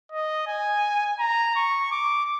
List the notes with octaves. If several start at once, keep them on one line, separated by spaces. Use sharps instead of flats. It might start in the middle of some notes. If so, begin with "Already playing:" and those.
D#5
G#5
A#5
C#6
D6